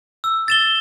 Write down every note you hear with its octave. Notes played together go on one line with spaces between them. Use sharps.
E6
A6 E7 G7